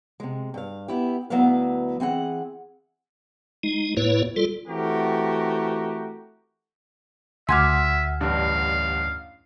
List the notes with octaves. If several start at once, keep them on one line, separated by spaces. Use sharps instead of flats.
C3 G#3
G2 F5
B3 E4 G4
D2 F#3 B3 E4 B4 F5
E3 C4 G#4 F#5
G#3 D#4
A2 A#3 E4 B4 C#5
G3 F4 A4
E3 A3 C4 F#4 G4 A#4
D2 E5 F#5 G#5 C6 D6 F6 G#6
A1 G2 D4 F5